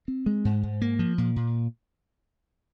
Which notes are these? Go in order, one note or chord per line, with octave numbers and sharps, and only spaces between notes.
C4
G#3
G#2
G#2
A#3
F3
A#2
A#2